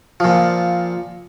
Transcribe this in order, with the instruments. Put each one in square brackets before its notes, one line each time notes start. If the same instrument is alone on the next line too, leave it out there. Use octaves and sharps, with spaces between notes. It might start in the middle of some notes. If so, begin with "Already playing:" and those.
[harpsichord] A#2 F3